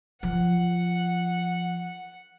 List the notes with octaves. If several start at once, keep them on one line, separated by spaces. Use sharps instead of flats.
F3 F#5